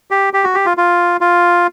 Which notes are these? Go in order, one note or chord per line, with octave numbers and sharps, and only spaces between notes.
G4
G4
F#4
G4
F4
F4
F4